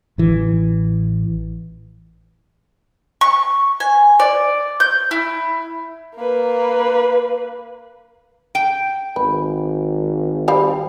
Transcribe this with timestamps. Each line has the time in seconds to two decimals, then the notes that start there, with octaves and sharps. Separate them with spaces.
0.18 A1 E3
3.21 C#6
3.80 G#5
4.20 D5
4.80 G6
5.11 E4
6.16 A#3 B4
8.55 G5
9.16 G#1 B4
10.48 G3 C4 F5